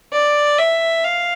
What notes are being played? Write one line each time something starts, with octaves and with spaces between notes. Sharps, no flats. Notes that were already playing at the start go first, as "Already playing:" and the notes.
D5
E5
F5